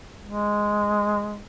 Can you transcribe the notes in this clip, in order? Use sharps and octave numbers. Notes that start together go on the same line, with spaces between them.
G#3